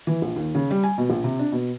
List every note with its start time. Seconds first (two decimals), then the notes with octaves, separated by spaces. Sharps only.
0.07 E3
0.22 A#1
0.36 D#2
0.55 C#3
0.71 G3
0.84 G#5
0.98 B2
1.10 A#1
1.24 C3
1.39 D4
1.52 B2